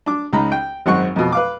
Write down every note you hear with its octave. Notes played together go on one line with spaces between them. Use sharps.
D4 D6
C#2 D#4 A#5 B5
G5
G#1 F#2 C4 F#5 C#6
F2 B2
B4 F5 D6